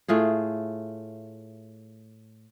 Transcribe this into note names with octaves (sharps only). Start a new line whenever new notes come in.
A2 A3 F4 G#4